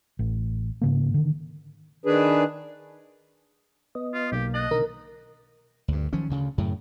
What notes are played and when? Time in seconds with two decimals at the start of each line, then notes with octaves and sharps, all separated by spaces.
0.19 A1
0.82 G#2 C#3 A#3
1.14 D3 D#3
2.06 D#3 D4 G#4 B4
3.95 B3 D#5
4.14 F4
4.32 B1 A#3 G4
4.54 D#5 A5 F#6
4.71 B2 D3 D#3 A#4
5.88 D2 G2
6.13 D#3 F3 F#3 C#4
6.29 D2 C#3
6.58 F#2 A2 C#3